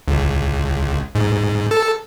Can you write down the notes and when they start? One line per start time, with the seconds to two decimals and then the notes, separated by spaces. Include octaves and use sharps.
0.08 C#2
1.15 G#2
1.71 A4